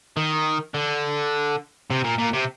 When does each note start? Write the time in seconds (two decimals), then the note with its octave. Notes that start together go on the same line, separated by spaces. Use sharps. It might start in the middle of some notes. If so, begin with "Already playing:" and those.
0.17 D#3
0.74 D3
1.91 C3
2.04 A#2
2.19 A#2
2.33 C3